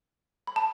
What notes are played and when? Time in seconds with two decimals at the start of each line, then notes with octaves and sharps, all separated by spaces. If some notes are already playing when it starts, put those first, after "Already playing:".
0.47 B5
0.56 A5